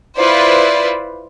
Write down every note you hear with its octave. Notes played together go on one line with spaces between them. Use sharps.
E4 F4 B4 C5 D5